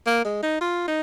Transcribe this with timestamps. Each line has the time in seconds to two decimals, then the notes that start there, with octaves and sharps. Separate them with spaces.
0.07 A#3
0.25 G#3
0.43 D#4
0.61 F4
0.88 D#4